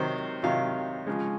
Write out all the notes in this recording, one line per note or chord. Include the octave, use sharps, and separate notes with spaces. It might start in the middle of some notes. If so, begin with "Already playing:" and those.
Already playing: C3 D#3 F#3 C5
C3 D#3 F#3 F5
C#3 F3 G#3